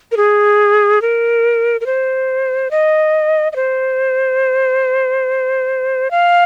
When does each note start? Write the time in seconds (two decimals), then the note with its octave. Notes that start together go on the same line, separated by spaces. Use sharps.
0.12 A#4
0.17 G#4
1.02 A#4
1.81 A#4
1.86 C5
2.71 D#5
3.52 D#5
3.56 C5
6.11 F5